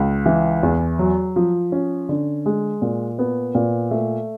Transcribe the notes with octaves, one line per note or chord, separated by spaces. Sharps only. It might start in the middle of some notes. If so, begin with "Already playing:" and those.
Already playing: C#2
E3
E2
F#3
F3
C#4
D3
G#3
A#2
B3
A#2
A3